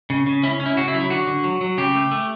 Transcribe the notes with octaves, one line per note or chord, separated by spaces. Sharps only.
C#3
C#3
C#4 E4
C#4
E4
C#3 F#4
E4
F#3
E4
D3 F#4
D3
F#3
F#3
C#3 G4
A3
A3